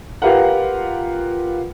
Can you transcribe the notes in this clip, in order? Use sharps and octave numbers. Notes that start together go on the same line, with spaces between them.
F4 G4 A#4 B4 F5 F#5